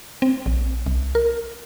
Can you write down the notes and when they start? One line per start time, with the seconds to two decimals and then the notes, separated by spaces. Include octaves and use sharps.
0.22 C4
0.46 A#1
0.86 C2
1.15 A#4